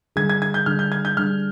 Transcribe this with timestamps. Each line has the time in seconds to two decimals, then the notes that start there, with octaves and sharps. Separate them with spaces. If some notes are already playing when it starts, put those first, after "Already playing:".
0.16 D3 G3 D4 G#4 G#6
0.30 G#6
0.42 G#6
0.54 G6
0.66 D3 G3 D4 G#4 F6
0.79 G6
0.92 G#6
1.05 G6
1.17 D3 G3 D4 G#4 F6